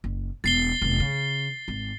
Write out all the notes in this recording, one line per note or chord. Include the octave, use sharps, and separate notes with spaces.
F#1
E1 A6 C7 G7
F1 E2
C#3
G#1